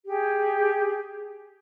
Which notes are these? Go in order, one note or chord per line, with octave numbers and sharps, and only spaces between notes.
G4 G#4